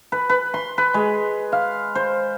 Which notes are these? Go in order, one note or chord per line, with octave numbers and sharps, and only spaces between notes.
B4
B4
C6
B4
G#3
F5
C5